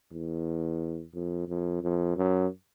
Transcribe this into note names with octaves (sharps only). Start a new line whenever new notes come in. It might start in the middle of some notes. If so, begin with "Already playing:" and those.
E2
F2
F2
F2
F#2